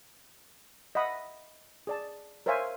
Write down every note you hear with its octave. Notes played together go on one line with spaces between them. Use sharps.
D#5 E5 F#5 B5 D#6
G#4 D5 A5
A#4 C5 C#5 E5 F5 G#5